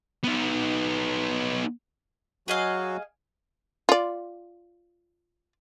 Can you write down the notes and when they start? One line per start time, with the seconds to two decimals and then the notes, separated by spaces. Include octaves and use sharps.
0.24 B3 D#4
2.48 F#3 F#4 G#4 D#5 F5
3.89 F4 D5